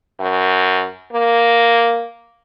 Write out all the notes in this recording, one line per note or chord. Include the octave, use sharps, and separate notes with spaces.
F#2
A#3